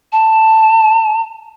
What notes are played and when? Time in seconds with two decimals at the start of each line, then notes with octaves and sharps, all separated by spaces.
0.12 A5